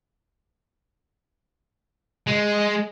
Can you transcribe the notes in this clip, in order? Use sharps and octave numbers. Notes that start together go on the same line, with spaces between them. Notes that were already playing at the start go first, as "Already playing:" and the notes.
G#3